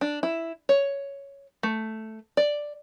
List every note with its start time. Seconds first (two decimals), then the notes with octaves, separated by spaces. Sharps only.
0.01 D4
0.23 E4
0.69 C#5
1.63 A3
2.37 D5